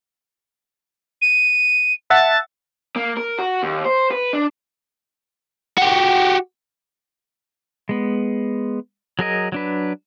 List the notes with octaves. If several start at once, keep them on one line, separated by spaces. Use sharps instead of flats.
D#7
E5 F#5 A5 A6
A#3
A#4
F#4
D#2
C5
B4
D4
F#4 G4
G#3 B3
F#3 G#4 A#4 D#5
F#3 D4 B4